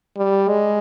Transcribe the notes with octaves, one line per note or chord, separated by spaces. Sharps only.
G3
G#3